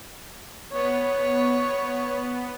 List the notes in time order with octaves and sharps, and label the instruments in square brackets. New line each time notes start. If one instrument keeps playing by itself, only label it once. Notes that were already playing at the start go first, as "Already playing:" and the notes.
[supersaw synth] B3 [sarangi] C#5